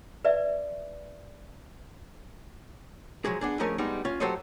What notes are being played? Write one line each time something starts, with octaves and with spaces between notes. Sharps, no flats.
B4 D5 E5
F3 F#3 G#3 G#4
B3 D4 G#4
F3 A3 C#4 G#4 A#4 D#5
G3 G#3 B3 D#4
C#4 F4
F#3 G4 A4 C5 C#5 D#5